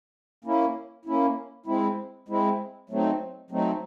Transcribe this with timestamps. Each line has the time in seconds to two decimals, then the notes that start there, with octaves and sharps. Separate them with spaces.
0.44 A#3 C#4 E4
1.05 A#3 C#4 E4
1.66 G#3 C4 E4
2.28 G#3 C4 E4
2.90 F#3 A3 C4 D#4
3.50 F#3 A3 C4 D#4